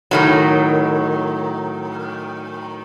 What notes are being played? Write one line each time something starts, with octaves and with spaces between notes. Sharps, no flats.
A2 D#3 F#3